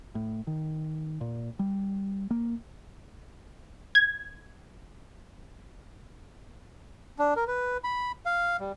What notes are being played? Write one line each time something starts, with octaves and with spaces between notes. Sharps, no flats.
A2
D#3
A#2
G3
A#3
G#6
D4
A#4
B4
B5
F5
G3